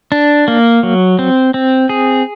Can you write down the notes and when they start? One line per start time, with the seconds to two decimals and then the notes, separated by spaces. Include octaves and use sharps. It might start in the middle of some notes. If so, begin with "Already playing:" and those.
0.12 D4
0.48 A#3
0.83 F#3
1.19 C4
1.54 C4
1.89 G#4